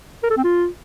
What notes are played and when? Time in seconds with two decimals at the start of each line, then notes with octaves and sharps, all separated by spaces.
0.23 A#4
0.30 A4
0.37 C4
0.44 F4